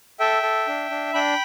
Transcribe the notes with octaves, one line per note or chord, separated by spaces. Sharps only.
A4 E5 G5
A4
D4
D4
D4 G5 B5